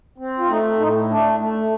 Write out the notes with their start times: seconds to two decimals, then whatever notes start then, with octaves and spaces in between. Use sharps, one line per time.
0.18 C4
0.39 F4
0.49 A3 D#4
0.79 A2 D#4
1.10 A3 D4
1.40 A3